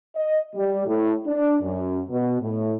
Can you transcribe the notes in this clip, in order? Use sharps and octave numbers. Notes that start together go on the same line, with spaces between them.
D#5
G3
A2
D4
F#2
B2
A2